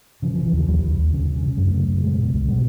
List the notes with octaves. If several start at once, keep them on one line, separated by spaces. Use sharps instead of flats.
C#3 F3
C#3 F3
E3
D#2 F3
D#2 G3
D#2
D#2
C#3
C#3
C#3
F#2 A3
C#3
F#2
B2 G#3
B2
C#2
B2 G3